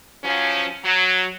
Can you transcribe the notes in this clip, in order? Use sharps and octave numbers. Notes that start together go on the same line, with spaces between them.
F3 F#3 C#4
F#3